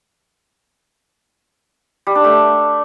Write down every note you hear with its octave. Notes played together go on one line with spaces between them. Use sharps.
G3
D4
A3